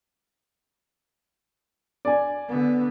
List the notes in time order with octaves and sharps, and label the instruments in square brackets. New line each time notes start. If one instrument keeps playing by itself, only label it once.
[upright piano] D5 G#5
[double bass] D3 B3